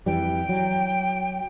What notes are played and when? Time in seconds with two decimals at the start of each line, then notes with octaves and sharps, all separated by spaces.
0.06 F2 E3 G3 G5
0.49 F#3